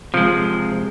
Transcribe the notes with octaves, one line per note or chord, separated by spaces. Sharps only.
C3 F3 G#3